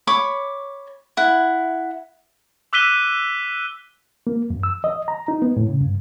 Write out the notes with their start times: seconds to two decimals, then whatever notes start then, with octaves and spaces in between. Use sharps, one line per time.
0.07 C#5 B5 D6
1.17 E4 F#5
2.73 D6 E6 F#6 B6 D#7 G7
4.27 A#3
4.50 F#2
4.63 E6
4.84 D#5
5.08 A#5
5.28 D#4
5.42 B3
5.57 A2
5.68 C#3
5.81 G2